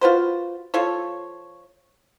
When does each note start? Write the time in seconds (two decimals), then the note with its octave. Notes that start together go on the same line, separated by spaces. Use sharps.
0.01 F4 F#4 B4 C5
0.74 F3 F4 A4 C#5